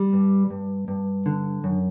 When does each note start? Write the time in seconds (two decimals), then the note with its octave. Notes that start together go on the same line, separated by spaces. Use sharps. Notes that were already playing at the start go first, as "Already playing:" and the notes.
Already playing: G3
0.13 G2
0.50 G2
0.88 G2
1.26 D3
1.64 F#2